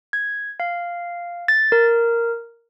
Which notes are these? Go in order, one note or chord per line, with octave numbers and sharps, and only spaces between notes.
G#6
F5
A6
A#4